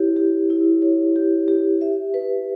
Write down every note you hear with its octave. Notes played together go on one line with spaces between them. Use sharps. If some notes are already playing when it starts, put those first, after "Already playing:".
Already playing: E4 G4 C#5
G4
E4
C#5
G4
G4
E5
B4